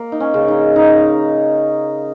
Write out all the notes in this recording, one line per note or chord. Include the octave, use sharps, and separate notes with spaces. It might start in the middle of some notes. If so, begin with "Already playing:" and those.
Already playing: A#3
D#4
C#4
C#3
D#4
C#3 D#4